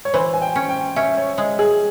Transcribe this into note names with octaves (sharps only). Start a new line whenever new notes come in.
C#5
E3 C5
G#5
G5
C#4
G5
C#4 E5
C#5
G#3
G#4